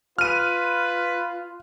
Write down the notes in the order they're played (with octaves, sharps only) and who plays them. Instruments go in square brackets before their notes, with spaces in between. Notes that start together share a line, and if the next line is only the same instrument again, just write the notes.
[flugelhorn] F4 [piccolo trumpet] B4 [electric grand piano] F6 D#7